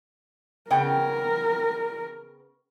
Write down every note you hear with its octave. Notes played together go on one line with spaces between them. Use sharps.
C#3 B3 A#4 G5